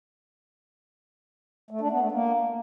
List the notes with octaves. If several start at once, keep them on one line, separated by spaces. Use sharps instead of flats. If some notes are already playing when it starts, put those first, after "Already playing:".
A3
D4
B3
A3
A#3